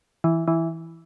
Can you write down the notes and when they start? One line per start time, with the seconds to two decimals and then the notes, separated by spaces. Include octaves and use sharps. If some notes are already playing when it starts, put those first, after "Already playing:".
0.24 E3
0.48 E3